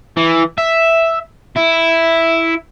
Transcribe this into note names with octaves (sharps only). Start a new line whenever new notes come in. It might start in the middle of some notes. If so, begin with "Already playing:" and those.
E3
E5
E4